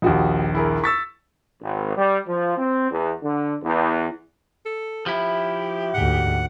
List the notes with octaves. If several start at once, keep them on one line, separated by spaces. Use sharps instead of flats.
A#1 D#2 F3 F#4 G4
E4 G#4 A#4
C#6 E6 A6 B6
G#1
G3
F3
C4
E2
D3
E2
A4
F3 E4 G4
D2 G#2 F#5